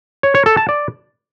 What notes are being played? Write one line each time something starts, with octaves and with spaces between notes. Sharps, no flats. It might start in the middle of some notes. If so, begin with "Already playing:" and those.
C#5
C#5
A4
A5
D5